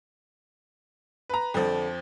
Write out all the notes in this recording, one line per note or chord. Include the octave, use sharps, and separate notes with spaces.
B4 A#5
F2 D3 F3